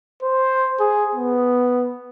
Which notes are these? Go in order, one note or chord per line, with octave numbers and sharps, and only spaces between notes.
C5
G#4
B3